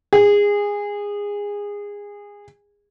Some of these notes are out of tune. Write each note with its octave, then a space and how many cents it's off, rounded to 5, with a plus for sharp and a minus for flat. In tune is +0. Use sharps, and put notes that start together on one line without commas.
G#4 -20